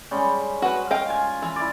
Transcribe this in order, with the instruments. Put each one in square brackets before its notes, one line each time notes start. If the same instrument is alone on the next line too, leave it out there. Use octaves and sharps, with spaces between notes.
[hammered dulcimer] G3 G#3 C#4
[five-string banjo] F#4 B4
D#5 F5 G5
[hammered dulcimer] F4 G#5
[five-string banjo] E3
[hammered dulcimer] E4 D5